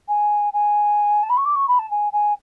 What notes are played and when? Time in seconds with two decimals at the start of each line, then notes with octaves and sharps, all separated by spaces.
0.08 G#5
0.53 G#5
1.23 A5
1.29 B5
1.37 C#6
1.45 D6
1.55 C#6
1.68 B5
1.79 A5
1.90 G#5
2.13 G#5